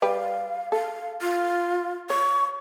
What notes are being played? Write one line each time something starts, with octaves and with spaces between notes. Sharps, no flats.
G3 G4 B4 F5
A4 F5
F4
C#5 C#6